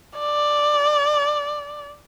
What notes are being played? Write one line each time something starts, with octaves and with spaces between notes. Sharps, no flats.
D5